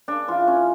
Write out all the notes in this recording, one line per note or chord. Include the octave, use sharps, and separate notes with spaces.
C#3 D4
E3 F4
C#3 C#4